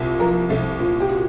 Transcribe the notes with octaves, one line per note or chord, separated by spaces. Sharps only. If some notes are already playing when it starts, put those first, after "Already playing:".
Already playing: C2 A#2
F3 A#4
C2 A4
A#2
G4
F#4